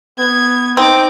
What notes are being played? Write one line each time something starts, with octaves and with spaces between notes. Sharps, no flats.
B3 G#6
C4 D#4 D6